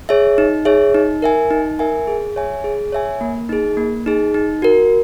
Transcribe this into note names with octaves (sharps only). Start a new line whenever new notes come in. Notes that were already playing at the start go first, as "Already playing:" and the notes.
G#4 C#5 E5
D#4
G#4 C#5 E5
D#4
A#4 E5 G#5
D#4
A#4 E5 G#5
G#4
C#5 E5 G#5
G#4
C#5 E5 G#5
A#3
D#4 G#4
A#3
D#4 G#4
D#4
F#4 A#4